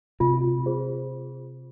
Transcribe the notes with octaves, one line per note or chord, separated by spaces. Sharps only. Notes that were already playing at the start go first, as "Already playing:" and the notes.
C3 F4
G#4 C5